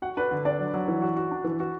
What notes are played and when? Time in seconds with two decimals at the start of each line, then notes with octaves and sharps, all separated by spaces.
0.02 F#4 F#5
0.17 D4 B4
0.31 D3
0.45 D4 D5
0.59 F#3
0.74 F#3
0.88 E3
1.02 F#4
1.16 F#4
1.31 D4
1.44 E3
1.60 F#4